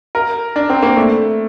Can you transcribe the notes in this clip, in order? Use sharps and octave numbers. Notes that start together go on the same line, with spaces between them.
A#4
D4
C4
A#3
A3